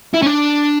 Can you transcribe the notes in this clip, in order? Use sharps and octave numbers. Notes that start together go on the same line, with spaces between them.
E4
C#4
D4